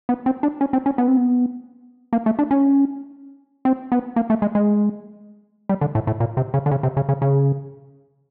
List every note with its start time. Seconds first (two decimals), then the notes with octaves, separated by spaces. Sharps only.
0.09 B3
0.26 C4
0.43 D4
0.61 C#4
0.73 C4
0.86 C#4
0.98 B3
1.08 C4
1.17 B3
2.13 A#3
2.26 A3
2.39 D4
2.51 C#4
3.65 C4
3.92 B3
4.16 A#3
4.30 A3
4.42 G#3
4.55 G#3
5.69 G3
5.81 D3
5.95 A2
6.07 A2
6.20 A#2
6.37 C3
6.54 C#3
6.66 D3
6.71 C#3
6.83 C3
6.97 C#3
7.09 C#3
7.22 C#3